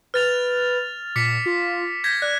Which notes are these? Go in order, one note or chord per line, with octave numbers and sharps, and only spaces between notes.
B4 F6 A6 F7
A#2 D6 B6 C#7
F4
G6 G#6 A#6 B6
D5 F#6